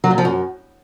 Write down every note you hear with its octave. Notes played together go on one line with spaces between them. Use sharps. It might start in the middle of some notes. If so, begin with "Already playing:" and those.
F#3
A#2
F3
F#2